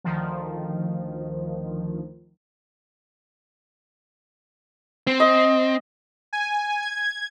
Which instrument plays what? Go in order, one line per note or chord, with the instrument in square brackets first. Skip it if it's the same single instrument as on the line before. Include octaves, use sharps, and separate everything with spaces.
[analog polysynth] D2 D#3 F3
[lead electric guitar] C4
[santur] D#5
[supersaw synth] G#5
G#6